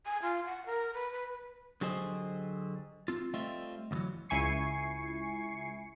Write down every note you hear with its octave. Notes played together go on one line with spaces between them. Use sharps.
G#5
F4
F#5
A#4
B4
B4
B4
D3 F#3 G4 G#4 C5 D#5
C4 F4
G3 A3 C4 F4 D#5 E5
D2 B2 D#3 E3 F#3
C#2 E4 G#5 C#6 C7 C#7